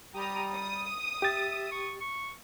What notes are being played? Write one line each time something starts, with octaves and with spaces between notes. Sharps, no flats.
G3 G4 A#5 D#6
D#6
G4 E5 A6
C#6
C#6